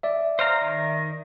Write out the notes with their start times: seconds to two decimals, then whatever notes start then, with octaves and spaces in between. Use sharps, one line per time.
0.03 D5 E5
0.39 C5 F5 A#5
0.61 D#3